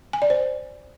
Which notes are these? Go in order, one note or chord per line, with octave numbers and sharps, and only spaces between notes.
G#5
D5
C5